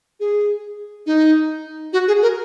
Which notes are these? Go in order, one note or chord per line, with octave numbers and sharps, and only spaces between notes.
G#4
D#4
F#4
G#4
A#4